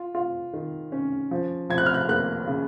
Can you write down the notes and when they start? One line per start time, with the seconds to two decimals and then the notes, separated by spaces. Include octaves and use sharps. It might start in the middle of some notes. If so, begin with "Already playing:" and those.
Already playing: F4
0.15 F4
0.53 D#3
0.92 C#4
1.31 F3
1.70 F3 G#6
1.78 F#6
1.86 F6
1.94 F#6
2.08 A#3 F#6
2.47 C#3